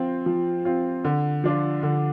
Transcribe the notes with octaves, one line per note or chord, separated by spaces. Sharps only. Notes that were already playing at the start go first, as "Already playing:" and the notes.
Already playing: F3 C4 F4
F3
C4 F4
D3
F3 D4 F4
D3